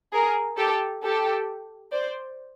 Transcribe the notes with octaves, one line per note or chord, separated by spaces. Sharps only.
G#4 A#4
G4 A4
G4 A4
C5 D5